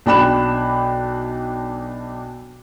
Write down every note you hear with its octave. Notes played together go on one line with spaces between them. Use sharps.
B1 D4 G5 B5 F#6 E7